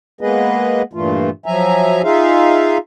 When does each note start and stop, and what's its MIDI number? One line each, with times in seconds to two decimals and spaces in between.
0.21 0.82 56
0.21 0.82 58
0.21 0.82 59
0.21 0.82 68
0.21 0.82 71
0.21 0.82 75
0.93 1.30 43
0.93 1.30 46
0.93 1.30 52
0.93 1.30 57
0.93 1.30 65
1.46 2.02 53
1.46 2.02 54
1.46 2.02 76
1.46 2.02 80
1.46 2.02 82
2.04 2.78 63
2.04 2.78 65
2.04 2.78 68
2.04 2.78 76
2.04 2.78 77